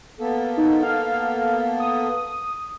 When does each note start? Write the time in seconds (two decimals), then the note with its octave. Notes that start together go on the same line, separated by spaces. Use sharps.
0.20 A#3 B3 A4
0.57 D#4
0.83 F5
1.80 D#6